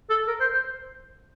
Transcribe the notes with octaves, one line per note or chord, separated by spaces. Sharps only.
A4
A#4
C5
C5